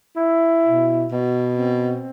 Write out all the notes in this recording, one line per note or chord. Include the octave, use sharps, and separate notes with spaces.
E4
B2
B2
C4